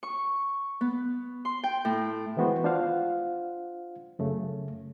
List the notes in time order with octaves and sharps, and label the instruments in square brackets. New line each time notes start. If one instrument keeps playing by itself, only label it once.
[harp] C#6
B3
C6
G5
A2
[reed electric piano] D#3 E3 G#3 B3 F#4 C5
D4 F4 C5 F5 F#5
F#2 C#3 A3